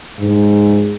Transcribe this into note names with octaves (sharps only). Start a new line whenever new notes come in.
G#2